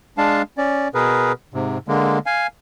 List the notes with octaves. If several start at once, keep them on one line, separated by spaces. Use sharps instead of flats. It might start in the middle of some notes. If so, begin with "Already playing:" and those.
G#3 D4 F5 A5
C#4 D5
B2 G#4 A#4 B4
G#2 C3
D3 G#3 A#3
F5 G#5